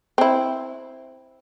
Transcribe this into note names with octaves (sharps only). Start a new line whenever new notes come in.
C4 E4